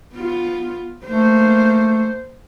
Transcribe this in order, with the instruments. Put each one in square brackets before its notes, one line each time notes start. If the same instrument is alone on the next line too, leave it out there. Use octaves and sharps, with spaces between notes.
[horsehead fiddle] B3 F4
[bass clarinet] A3 [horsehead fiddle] A#3 C5